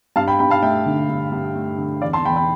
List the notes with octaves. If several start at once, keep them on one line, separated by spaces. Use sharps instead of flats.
G2 F5 A5
G5 B5
G2 G5 B5
F5 A5
A3 E5 G5
D3
G2
G2
A3
D3
E2 D5 F5
A5 C6
E2 G5 B5
G5 B5